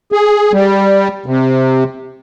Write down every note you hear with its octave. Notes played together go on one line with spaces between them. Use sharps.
G#4
G3
C3